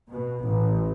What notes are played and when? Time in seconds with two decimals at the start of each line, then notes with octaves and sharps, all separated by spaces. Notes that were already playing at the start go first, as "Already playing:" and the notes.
0.11 B2
0.43 A1